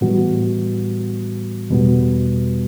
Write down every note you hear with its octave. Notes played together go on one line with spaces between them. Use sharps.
A2 E3 G3 B3 F#4
E2 B2 G3 B3 F#4